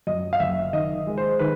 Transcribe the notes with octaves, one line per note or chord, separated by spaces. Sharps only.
F#2 D#5
F5
F#1 E5
D#3 D#5
G#3
C5
D#3 B4